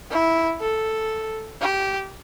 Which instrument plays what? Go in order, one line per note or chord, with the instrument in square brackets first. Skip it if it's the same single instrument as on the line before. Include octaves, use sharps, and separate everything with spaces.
[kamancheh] E4
A4
G4